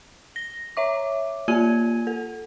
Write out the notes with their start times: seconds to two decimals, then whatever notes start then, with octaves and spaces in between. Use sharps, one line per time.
0.36 A#6
0.77 C#5 E5 D6
1.48 A#3 F4 G#5 G#6 D#7
2.07 A4